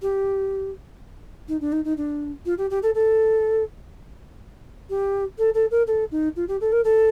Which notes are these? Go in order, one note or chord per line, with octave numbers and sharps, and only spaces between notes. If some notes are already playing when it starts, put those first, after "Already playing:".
G4
D#4
D4
D#4
D#4
D4
F4
G4
G4
A4
A4
G4
A4
A4
A#4
A4
D#4
F4
G4
A4
A#4
A4